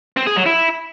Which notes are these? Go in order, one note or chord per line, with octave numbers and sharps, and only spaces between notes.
C4
G#4
F#3
E4